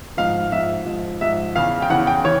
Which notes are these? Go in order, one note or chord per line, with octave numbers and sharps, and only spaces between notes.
G#2 F3 F5
G#2 F3 E5
G#2 F3
G#2 F3 E5
E2 C#3 E3 F5
G5
E2 C#3 E3 F#5
G5
E3 C#5